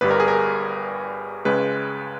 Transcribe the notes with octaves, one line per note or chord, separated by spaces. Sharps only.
G1 G2 G3 B4
A#4
G#4
A#4
C#2 C#3 G#3 B4